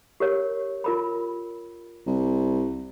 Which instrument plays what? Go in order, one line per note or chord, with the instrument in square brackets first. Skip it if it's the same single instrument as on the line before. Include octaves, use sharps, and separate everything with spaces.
[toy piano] G4 A#4 C#5
F4 A#4 B5
[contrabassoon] C2